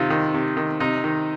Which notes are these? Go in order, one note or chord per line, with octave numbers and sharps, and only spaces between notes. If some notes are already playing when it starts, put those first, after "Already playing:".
Already playing: C3 D#3 F4
D#3
C3
D#3
C3 D#4
D#3